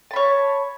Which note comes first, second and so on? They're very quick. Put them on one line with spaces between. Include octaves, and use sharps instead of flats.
A5 B5 C#5